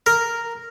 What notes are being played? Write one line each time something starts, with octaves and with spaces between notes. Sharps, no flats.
A#4